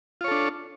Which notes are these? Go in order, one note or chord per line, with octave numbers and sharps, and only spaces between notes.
D4 F4 A4 C#5